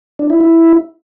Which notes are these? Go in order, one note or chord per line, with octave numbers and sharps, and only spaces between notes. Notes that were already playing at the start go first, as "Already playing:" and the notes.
D4
E4
E4